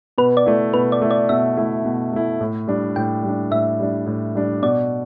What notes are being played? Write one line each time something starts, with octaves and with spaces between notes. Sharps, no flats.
B2 B4
D5
A3 E4
B2 B4
D5
A3 E4
D5
B2 E5
A3 E4
B2
A3 E4
A2
G3 D4
A2 G5
G3 D4
A2 E5
G3 D4
A2
G3 D4
B2 D5